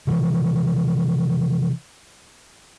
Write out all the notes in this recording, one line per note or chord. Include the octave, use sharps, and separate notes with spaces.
C3 E3 F3